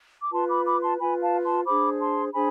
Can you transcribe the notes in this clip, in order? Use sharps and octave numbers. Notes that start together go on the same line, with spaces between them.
D6
F4 B4 A5 C6
B5 D6
B5 D6
A5 C6
F4 B4 G#5 B5
F5 A5
A5 C6
D4 G#4 C5 B5 D6
A5 C6
D4 G#4 C5 G#5 B5